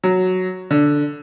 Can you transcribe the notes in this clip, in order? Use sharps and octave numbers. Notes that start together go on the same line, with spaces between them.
F#3
D3